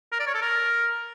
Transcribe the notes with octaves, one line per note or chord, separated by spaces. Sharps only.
A#4
D5
C#5
A4
A#4